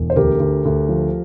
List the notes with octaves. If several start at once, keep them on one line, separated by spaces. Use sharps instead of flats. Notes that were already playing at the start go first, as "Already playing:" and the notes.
Already playing: E1
C5
D2 G4 A#4
D2
D2
F3